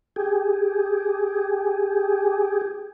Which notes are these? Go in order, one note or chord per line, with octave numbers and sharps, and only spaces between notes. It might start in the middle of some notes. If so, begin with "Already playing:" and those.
G4 G#4